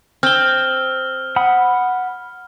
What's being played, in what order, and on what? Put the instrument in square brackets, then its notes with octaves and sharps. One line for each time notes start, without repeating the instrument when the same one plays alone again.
[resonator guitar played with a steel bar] C4 [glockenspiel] F6 G7
[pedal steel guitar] F#5 B5 D#6